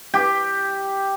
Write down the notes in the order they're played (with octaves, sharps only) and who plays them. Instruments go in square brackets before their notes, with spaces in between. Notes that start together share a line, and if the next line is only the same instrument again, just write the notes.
[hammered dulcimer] G4